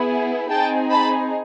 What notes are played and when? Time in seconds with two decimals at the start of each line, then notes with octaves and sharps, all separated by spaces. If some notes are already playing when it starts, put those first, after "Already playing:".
Already playing: B3 E4 G#4
0.49 C4 D#4 G#4 G5 A5
0.90 A5 B5